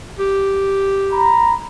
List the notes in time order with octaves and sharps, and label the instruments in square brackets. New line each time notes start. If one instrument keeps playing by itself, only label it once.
[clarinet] G4
[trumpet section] A#5 B5